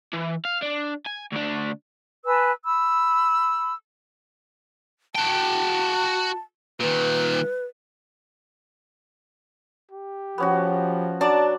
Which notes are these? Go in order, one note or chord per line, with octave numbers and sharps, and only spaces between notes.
E3
F5
D4
G#5
D2 D4
B4 G#5 A5 E6
B5 E6
F#4 G5 A5
A#2 D#3 B4
G4
F3 B3 C#4 F#4
F#3 D4 D5 A5